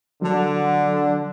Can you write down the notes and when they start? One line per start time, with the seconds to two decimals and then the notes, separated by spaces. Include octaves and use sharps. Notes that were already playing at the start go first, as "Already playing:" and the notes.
0.22 D3 F#3